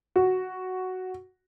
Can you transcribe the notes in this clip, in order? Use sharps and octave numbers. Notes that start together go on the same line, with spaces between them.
F#4